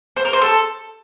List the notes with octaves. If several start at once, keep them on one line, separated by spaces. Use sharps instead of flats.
C5
A#4
C5
A4